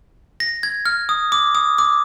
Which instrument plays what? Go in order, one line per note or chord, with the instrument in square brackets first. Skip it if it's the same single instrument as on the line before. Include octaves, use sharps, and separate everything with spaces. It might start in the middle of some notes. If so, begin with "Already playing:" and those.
[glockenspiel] A#6
G#6
F6
D#6
D6
D#6
D6